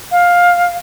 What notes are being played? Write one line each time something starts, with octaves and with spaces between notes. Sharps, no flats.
F5